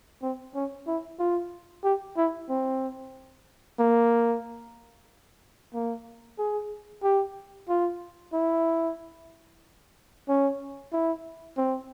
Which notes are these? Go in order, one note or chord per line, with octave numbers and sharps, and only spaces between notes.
C4
C#4
E4
F4
G4
E4
C4
A#3
A#3
G#4
G4
F4
E4
C#4
E4
C4